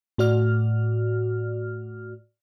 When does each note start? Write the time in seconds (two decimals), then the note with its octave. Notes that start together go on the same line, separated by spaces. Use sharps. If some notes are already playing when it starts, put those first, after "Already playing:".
0.18 A2 F#4 D5 F6